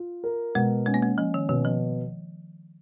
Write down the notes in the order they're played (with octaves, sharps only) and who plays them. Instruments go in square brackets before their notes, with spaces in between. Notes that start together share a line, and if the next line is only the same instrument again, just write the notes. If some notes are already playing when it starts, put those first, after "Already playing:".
Already playing: [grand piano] F4
A#4
[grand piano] B2 [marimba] G#3
[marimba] G#3 [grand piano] C#4
[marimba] A#3
G#3
[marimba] F3 [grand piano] C#4
[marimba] D#3
[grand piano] B2 [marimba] D#3
[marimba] F3